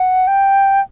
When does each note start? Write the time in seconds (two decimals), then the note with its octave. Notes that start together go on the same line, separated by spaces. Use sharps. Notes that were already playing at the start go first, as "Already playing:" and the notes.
Already playing: F#5
0.27 G5